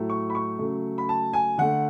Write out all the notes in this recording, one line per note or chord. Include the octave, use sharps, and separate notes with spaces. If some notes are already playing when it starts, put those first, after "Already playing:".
Already playing: A2 F#3 A3
C#6
B5
C#6
C#3 F#3 A3
B5
A5
G#5
D3 A3 F#5